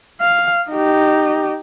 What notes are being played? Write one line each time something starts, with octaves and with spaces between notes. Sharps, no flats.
F5
D#4 G4